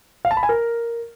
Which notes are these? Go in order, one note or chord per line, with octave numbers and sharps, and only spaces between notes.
F5
A5
B5
G#5
A#4